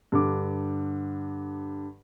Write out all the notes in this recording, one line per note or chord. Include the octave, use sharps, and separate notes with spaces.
G2 D3 D6